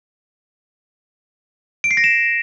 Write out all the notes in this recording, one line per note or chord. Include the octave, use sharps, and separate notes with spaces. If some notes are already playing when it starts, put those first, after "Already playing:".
D7
C7
A#6
E7